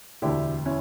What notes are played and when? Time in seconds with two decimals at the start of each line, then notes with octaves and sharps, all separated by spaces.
0.22 E1 D2 D3 E4 G4
0.66 C#4 E4